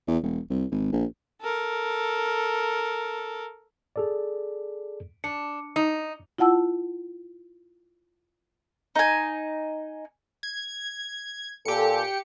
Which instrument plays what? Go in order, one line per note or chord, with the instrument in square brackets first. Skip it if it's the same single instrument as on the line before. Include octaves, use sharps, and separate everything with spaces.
[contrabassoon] E2
E1
C2
G#1
A#1
[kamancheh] A4 A#4
[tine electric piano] G#4 A4 D5
[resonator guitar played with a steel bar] D4 [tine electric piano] C#7
[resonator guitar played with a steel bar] D#4
[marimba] E4 F4 F#5 A5 E6
[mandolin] D#4 G#5
[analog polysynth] G#6
[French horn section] A#2 A4 [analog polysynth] G4 C#7